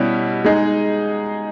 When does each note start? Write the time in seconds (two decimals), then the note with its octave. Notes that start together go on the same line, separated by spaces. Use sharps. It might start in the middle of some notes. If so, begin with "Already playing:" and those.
Already playing: B2 G3 C#4 E4
0.45 G#3 D#4 G#4